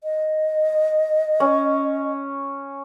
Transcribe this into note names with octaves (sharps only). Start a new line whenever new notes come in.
D#5
C#4